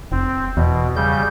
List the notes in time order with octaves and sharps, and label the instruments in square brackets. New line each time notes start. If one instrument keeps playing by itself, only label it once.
[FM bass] F1 [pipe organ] C4
[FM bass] E2 [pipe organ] B2
[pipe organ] C#3 G3 G6